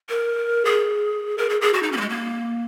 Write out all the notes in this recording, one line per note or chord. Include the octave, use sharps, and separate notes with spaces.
A#4
G#4
A#4
G#4
G#4
F#4
D#4
C#4
A#3
G#3
A#3